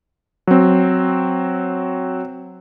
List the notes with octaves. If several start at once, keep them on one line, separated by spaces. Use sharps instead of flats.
F#3 C4